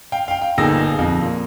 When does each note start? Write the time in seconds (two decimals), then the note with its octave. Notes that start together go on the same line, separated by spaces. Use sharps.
0.12 F5 G5
0.28 F5 G5
0.42 G5
0.58 G1 A#2 D#4 G#4 E6 A#6
0.99 F2
1.22 A#2